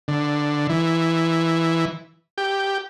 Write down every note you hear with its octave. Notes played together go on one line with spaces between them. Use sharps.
D3
E3
G4